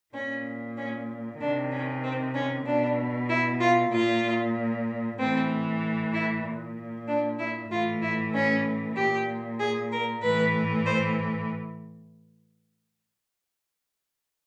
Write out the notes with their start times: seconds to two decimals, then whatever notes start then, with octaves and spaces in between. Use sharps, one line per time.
0.14 A#2 C#4
0.77 C#4
1.40 C3 D#3 D4
1.71 C#4
2.03 C4
2.34 C#4
2.65 B2 D4
3.29 E4
3.60 F4
3.91 A#2 F4
5.18 A2 E3 C4
6.13 E4
6.44 A#2
7.07 D4
7.38 E4
7.70 A2 E3 F4
8.02 E4
8.34 C#4
8.96 A#2 G4
9.59 G#4
9.92 A#4
10.22 A2 E3 B4
10.86 C5